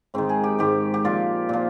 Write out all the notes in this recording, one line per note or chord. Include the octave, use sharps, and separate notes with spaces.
G#2 D#3 C4
G#4
G4
G#2 D#3 G4
G4
A#2 F3 F4
A#2 F3